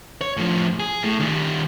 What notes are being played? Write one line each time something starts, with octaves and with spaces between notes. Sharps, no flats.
C#5
A2 F3
G#4
A2
D#3 G3